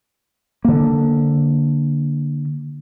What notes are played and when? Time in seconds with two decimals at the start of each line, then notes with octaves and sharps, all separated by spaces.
0.65 D3 A#3